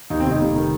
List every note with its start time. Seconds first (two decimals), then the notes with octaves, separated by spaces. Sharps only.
0.10 D#2 D#4
0.20 C4
0.26 F1
0.31 D#4
0.41 F1
0.56 D#3